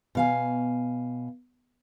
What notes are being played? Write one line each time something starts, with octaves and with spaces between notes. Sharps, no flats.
B2 F5 G#5